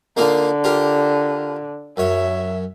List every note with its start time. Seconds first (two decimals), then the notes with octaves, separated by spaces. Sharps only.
0.17 D3 A#3 D#4 F4
0.64 F4 G4 A#4
1.97 F#2 C#5 E5